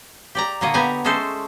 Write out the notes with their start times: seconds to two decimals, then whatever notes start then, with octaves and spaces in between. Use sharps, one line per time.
0.35 G4 D5 A#5
0.61 A#2 D3 A#3 C#5 D#5
0.74 B3 G4 G#5 A#5
1.05 G#3 A3 C#4 A4 C5